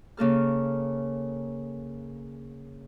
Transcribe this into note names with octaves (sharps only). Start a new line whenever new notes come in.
C#3 A#3 A4 F6